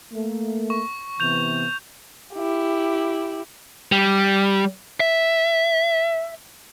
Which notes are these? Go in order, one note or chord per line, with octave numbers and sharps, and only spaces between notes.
A3 A#3
C#6
C3 E3 B3 G6 F7
E4 G4
G3
E5